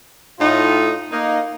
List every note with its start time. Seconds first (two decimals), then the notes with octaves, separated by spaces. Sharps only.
0.40 A2 D#4 F4
1.12 A#3 D#4